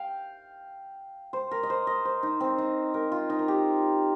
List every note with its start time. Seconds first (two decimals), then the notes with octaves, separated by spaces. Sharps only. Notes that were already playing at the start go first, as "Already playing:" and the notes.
Already playing: F5 G5
1.33 C5
1.51 A#4
1.63 D#5
1.70 C5
1.87 D#5
2.05 C5
2.23 D#4
2.40 C4
2.58 D#4
2.94 A#4
3.12 F4
3.30 D#4
3.39 A#4
3.48 G4